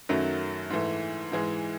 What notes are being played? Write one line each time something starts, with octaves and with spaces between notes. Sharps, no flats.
F#2 D#3 F#3 A3
G#2 E3 A3
G#2 E3 G#3